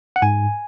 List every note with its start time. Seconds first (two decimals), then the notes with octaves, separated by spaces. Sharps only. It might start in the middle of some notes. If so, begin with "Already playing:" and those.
0.16 F#5
0.22 G#2 G#5